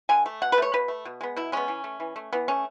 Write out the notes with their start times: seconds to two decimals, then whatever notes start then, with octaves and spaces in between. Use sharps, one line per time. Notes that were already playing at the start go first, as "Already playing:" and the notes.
0.09 D3 G#5
0.26 A3
0.42 B2 F#5
0.52 B4
0.58 A3 C#5
0.73 B2 B4
0.88 A3
1.05 B2
1.21 G#3 B3
1.36 B2 E4
1.52 G#3 B3 C#4
1.68 E3
1.84 A3
2.00 E3
2.16 A3
2.33 E3 B3
2.48 A3 C#4